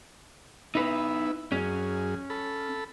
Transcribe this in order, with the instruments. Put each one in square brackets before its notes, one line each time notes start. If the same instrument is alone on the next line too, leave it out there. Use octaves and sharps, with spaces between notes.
[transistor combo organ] B3 E4 [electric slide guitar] D#4 B4
[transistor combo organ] F#2 G#4 [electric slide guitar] C#4
[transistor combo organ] A4 B5